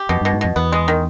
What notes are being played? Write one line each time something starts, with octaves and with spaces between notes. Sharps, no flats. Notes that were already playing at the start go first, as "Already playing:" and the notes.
Already playing: G4
F2 B2
G2 B2
G#2
F2 B2
E2 B3
G#3
D#3